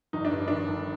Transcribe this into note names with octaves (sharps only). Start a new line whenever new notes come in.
G1 D#4
D4
G2
D#3 D4
G1